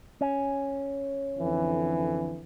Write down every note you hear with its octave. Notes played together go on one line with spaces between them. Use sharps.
C#4
F2 D3 E3